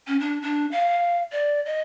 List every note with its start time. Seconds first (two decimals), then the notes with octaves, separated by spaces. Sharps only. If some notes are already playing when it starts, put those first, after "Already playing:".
0.07 C#4
0.20 D4
0.42 D4
0.72 F5
1.32 D5
1.66 D#5